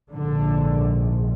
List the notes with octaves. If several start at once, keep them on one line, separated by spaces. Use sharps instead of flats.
A#1 G#2 D3